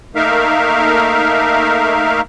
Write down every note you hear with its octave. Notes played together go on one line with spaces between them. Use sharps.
A3 A#3 D#4 A#4 E5 F5